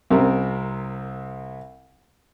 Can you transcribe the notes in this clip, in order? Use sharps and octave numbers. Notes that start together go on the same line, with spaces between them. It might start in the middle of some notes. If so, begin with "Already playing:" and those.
C2 C3 A#4